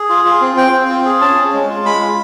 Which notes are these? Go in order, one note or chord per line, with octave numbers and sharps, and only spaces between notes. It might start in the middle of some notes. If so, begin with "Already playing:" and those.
Already playing: G#4
F4
F4
C4
C4 G5
C4
F4
G#4
C#4 A5
C#4
G#3
F4
G#3 B5
F4